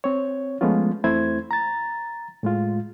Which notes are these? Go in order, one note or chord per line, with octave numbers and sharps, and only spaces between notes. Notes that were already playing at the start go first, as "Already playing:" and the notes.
C4 C#5
F3 G#3 A3 B3 C#4 F4
E2 A3 C4 E4 C5 G#6
A#5 A6
A2 G#3 F4